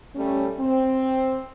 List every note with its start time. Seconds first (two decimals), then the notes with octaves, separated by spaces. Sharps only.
0.15 G3 A3 C#4
0.60 C4